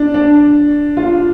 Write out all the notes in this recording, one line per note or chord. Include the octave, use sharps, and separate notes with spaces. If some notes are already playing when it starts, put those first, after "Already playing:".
Already playing: D4
D4
F4